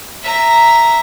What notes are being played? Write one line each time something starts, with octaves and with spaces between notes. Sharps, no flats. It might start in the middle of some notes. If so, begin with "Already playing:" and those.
E5 A#5